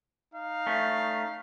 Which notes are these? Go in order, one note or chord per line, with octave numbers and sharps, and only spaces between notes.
D#4 F5
A3 C#4